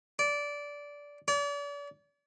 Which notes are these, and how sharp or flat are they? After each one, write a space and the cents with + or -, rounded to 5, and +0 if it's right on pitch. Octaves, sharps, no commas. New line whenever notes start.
D5 -15
D5 -40